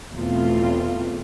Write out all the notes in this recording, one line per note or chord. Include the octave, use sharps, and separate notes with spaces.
E2 B2 A3 C4 F4